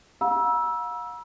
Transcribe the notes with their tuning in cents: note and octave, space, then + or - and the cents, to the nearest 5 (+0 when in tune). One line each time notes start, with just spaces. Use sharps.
F5 +40 A#5 +45 E6 +0